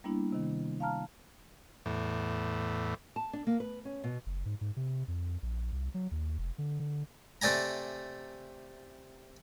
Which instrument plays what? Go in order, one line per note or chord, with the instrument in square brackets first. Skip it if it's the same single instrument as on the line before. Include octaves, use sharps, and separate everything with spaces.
[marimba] G3 A#3 B3 D4 E4
C3 D#3
F5 A5 A#5 F6
[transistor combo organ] E2 A2
[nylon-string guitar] A5
D4
A#3
B4
C#4
B2
[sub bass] F#1
G#2
G#2
C3
F2
A#1
C2
F#3
D#2
F1
D3
D3
[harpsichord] C3 A3 D5 G#5 A#5